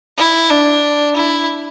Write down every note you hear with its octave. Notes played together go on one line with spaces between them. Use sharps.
E4
D4
E4